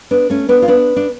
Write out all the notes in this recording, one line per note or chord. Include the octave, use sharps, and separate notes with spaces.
B3 D4
A3 C#4
B3 D4
F4
B3 D4
D4